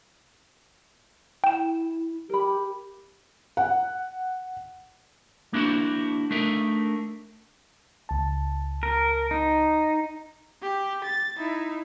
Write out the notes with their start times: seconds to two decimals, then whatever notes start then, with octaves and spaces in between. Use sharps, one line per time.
1.44 E4 G5 E7
2.30 G4 A#4 B5
3.57 F#5
5.53 A#3 D4 E4 F#4 C5
6.31 A3 D4 D#4 A#4 E5
8.09 C#2 A5
8.83 A#4
9.31 D#4
10.62 G4
11.05 A6
11.37 D#4 E4